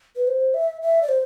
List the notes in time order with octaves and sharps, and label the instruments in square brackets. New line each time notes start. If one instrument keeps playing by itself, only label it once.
[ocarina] B4
C5
E5
E5
D5
C5